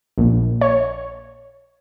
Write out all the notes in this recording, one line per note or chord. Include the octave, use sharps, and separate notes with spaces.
A#1
C#5